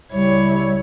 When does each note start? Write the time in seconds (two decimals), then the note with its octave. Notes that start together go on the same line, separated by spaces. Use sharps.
0.13 C#2 G3 E4 C#5